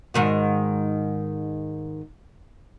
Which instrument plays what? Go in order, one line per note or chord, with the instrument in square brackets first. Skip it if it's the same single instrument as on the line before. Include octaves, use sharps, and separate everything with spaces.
[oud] G#2 D#3 F#4